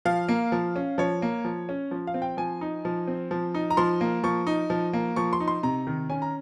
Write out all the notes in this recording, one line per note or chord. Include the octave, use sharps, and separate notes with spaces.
F3 F5
A#3
F3
C#4
F3 C#5
A#3
F3
C#4
F3
F5
C4
G5
F3 G#5
D#4
F3
C4
F3
D#4
A#5
F3 C6
A#3
F3 C#6
D#4
F3
A#3
F3 C#6
C6
D#4
C6
C3 A#5
D#3
C#4 G#5
A#5